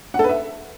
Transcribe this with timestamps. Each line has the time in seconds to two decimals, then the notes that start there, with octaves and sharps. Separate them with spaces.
0.14 F#5
0.19 A4
0.24 B4
0.29 E5